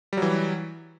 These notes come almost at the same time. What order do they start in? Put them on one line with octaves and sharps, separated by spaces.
G3 F#3 E3